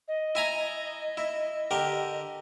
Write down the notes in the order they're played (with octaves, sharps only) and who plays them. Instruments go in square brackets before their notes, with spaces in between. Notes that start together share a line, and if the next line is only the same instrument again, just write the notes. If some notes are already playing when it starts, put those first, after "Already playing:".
[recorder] D#5
[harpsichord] E4 G#5 A#5
E4
D3 G4 A#4